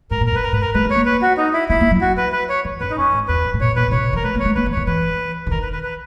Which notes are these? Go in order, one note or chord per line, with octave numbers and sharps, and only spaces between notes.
G#2 A#4
A#2
A#4
F#2
B4
A#4
G#2 B4
A#4
G#3 B4
G#3
C#5
A#3
B4
F#4
D#4
E4
B3 E4
A#3
F#3
F#4
B4
B4
C#5
E3
F#2 B4
D#4
F#2 C#4
G#2
E2 B4
F#2
G#2
A#2 C#5
A#2 B4
C#3
B2 C#5
B2
E3
A#4
G#3 B4
A#3
C#5
G#3
A#3 B4
E3
D#3 C#5
E3 B4
C#3
D#3 A#4
B4
B4
B4